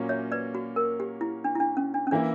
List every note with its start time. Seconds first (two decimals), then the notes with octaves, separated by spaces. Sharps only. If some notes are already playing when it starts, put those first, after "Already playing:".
Already playing: A#2 F#3 A#3 C#4
0.09 C#5 E5
0.32 B4 D5
0.55 F#4
0.76 A#4
1.00 G4
1.21 E4
1.44 D4
1.55 E4
1.60 D4
1.77 C#4
1.94 D4
2.07 C#4
2.11 E3 A#3 D4 E4